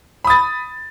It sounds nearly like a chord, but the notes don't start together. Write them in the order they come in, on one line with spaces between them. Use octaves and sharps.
B5 D#6 A6